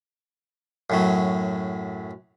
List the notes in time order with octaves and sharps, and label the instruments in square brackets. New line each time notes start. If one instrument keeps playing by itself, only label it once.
[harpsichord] F#2 A2 F#3